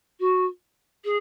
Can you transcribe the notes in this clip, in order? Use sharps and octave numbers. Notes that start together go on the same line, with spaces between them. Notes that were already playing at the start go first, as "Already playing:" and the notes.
F#4
G#4